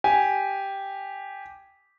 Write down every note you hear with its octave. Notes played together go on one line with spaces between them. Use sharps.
G4 G#5